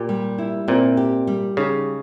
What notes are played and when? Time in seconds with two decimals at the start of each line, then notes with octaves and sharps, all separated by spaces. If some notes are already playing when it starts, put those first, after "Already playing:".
Already playing: A#2 G4
0.09 G3
0.38 E4
0.68 A#2 C4
0.97 G4
1.27 G3
1.57 C#3 D#4